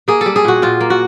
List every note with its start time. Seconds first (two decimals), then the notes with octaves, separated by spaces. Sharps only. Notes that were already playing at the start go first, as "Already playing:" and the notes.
0.08 A#3 G#4
0.21 G3 A4
0.36 G#4
0.44 A#2 F#4
0.62 A#2 F4
0.81 A#3
0.90 F#4